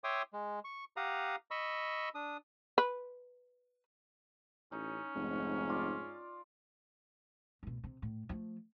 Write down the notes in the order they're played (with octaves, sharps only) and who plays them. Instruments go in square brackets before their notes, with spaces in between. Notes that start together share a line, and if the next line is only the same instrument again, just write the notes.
[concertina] C#5 E5 G5 C6 D6 D#6
G#3
C#6
G4 F5 F#5 A#5 D#6
D#5 B5 C#6 E6
D4 D#6
[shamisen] B4
[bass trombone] A1 [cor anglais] C#4 [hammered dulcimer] D#4
[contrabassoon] F1 [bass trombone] G#2
[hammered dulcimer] F4 D5
[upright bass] D2 B2
C3
A2
F3 A3